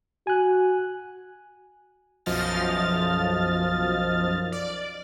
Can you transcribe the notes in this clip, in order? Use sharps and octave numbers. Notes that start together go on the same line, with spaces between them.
F#4 G#5 F#6
B1 F#2 F3 D#5 F6 A6
D5